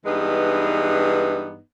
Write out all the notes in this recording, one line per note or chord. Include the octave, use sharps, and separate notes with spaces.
G2 E3 G#3 B3 D4 D#4